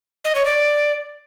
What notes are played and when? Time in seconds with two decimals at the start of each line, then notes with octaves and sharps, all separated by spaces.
0.25 D#5
0.35 C#5
0.45 D5